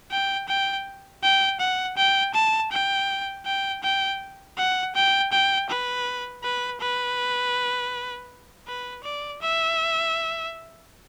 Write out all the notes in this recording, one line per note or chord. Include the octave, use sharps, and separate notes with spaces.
G5
G5
G5
F#5
G5
A5
G5
G5
G5
F#5
G5
G5
B4
B4
B4
B4
D5
E5